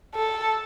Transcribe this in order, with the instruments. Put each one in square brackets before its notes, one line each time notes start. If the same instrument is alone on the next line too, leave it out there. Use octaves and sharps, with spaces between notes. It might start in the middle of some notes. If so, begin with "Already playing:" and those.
[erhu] A4